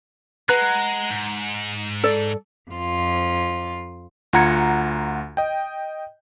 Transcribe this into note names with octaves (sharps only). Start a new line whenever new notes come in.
G#3 B4 F#5 A#5 F#6
G#2
A4 D5
F2 F4
D2 F4 F#5 A#5 G#6 C#7
D#5 G5